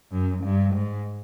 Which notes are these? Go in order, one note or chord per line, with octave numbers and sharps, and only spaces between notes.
F#2
G2
G#2